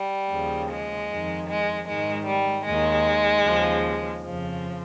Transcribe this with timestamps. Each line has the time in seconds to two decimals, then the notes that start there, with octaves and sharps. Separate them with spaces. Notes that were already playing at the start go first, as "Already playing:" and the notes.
Already playing: G3
0.31 D#2 C#3 F3
0.70 G#3
1.09 F2 D#3
1.49 G#3
1.87 G#2 D#3 G#3
2.26 G3
2.66 D#2 D#3 G#3
3.43 D#2 C#3 F3
4.22 F2 C#3 F3